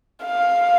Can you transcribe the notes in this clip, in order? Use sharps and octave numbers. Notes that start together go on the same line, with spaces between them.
F5